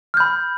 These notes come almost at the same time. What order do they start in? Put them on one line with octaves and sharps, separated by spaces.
F6 G6 B5